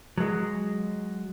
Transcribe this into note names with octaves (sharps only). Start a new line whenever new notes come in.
F#3 G#3